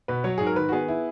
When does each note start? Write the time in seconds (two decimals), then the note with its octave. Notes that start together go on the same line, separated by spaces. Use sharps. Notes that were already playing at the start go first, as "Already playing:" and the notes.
0.08 B2 B4
0.24 F#3 C#5
0.38 G#2 G#4
0.46 A#4
0.56 D#3 B4
0.69 F#4
0.72 B3 G#4
0.88 E4